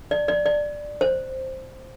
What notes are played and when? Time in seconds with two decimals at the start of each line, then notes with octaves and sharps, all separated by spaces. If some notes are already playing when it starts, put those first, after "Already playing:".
0.11 D5
0.28 D5
0.46 D5
1.01 C5